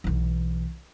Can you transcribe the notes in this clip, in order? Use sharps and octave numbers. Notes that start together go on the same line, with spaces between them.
B1 E3